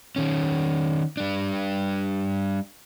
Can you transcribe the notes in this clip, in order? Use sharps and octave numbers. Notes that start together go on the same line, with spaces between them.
D#3 C#4
G3 D4